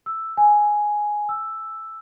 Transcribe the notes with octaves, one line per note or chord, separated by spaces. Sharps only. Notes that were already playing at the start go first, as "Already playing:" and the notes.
E6
G#5
E6